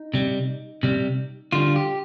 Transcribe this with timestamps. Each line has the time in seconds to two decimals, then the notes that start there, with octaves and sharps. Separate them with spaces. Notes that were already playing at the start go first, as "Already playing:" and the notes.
Already playing: D#4
0.14 C3 G3
0.83 C3 G3
1.52 D3 G3 F4
1.76 G4